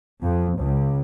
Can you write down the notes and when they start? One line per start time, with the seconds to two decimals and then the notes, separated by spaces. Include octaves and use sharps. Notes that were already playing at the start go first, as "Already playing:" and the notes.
0.21 F2
0.58 C#2